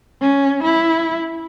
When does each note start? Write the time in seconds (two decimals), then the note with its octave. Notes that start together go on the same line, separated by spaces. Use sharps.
0.21 C#4
0.64 E4